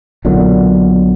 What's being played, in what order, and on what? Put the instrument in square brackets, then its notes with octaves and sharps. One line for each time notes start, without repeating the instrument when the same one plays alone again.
[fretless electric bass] B1 A#2 D3 F#3